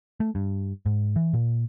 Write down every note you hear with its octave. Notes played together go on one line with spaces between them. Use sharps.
A3
G2
G#2
E3
A#2